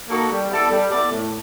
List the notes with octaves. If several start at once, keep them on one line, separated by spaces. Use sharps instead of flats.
A#3 D#4 F#4 A4
G3
B3 E4 A4 D5
G3
B3 E4 A4 D5
A2